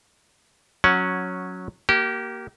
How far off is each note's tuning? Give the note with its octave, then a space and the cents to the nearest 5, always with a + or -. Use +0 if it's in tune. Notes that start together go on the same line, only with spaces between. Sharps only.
F#3 -10 C#4 +0 F#5 +0
A#3 +0 G4 -30